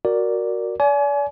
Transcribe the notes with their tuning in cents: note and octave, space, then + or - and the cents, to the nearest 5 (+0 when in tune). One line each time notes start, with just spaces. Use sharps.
F#4 +0 A#4 +0 D5 +0
D5 -35 G#5 +30